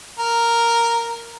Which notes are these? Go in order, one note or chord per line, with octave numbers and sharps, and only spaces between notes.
A#4